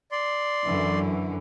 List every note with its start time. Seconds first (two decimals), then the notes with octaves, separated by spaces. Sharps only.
0.12 D5 C6
0.64 F#2 D3 E3